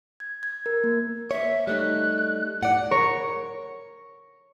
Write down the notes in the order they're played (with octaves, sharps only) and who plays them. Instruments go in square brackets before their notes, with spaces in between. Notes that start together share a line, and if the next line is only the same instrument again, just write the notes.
[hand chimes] G#6
G#6
A#4
A#3
[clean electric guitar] C#5 [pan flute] E5
[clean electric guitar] G3 A3 D#4 [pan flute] F#6
[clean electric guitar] A2 D5 [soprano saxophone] F#5
[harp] A#4 C#5 C#6